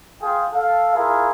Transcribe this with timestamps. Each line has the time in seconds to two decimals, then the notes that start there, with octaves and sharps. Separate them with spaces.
0.21 F4 G#4 G5
0.53 A4 F5
0.95 E4 F4 G#4 A#4